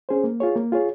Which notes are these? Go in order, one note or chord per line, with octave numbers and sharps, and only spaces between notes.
C#4 G#4 C5
A#3
F4 G#4 C#5
A#3
F4 G#4 C#5